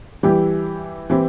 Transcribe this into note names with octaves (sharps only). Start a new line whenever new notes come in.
E3 G3 E4 G4
E3 C4 E4 G4